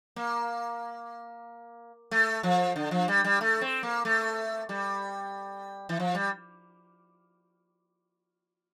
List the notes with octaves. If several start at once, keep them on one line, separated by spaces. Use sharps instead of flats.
A#3
A3
F3
D3
F3
G3
G3
A3
C4
A#3
A3
G3
E3
F3
G3